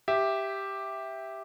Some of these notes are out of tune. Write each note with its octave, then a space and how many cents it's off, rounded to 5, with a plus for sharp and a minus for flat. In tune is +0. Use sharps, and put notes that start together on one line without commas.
G4 +0 E5 +0